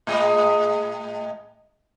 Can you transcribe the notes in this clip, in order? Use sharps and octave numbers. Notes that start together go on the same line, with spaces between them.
A2 G#3 D#5